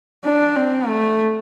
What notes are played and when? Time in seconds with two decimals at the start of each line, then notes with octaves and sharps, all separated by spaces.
0.25 D4
0.56 C4
0.88 A3